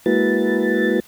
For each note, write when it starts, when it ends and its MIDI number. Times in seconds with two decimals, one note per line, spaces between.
0.06 1.00 56
0.06 1.00 58
0.06 1.00 64
0.06 1.00 66
0.06 1.00 71
0.06 1.00 93